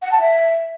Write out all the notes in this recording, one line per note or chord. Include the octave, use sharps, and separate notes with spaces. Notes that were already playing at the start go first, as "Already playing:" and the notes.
F#5
A5
E5